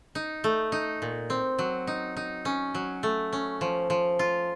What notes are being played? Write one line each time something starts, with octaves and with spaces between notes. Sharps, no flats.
D#4
A3
D#4
A#2
C4
F#3
D#4
D#4
C#4
F#3
A3
C#4
F3
F3
F4